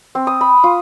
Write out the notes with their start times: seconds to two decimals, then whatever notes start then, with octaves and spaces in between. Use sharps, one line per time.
0.15 C4
0.27 D#6
0.41 B5
0.64 F4